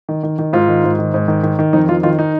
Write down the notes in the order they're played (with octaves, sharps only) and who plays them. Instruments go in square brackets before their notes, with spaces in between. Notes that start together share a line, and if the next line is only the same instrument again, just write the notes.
[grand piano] D#3
D#3
D#3
G#2 F4
D#3
G#2
D#3
G#2
D#3
D#3
D#3
F2 D#4
D#3 F4
D#3 F4
D#4